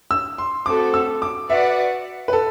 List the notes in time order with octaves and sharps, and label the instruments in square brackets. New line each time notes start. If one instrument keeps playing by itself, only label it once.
[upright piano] E6
C6
[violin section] A3 C4 F#4 A4 [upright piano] D6
[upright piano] E6
D6
[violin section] F#4 B4 D5 F#5 [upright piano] E5
[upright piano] B4
A4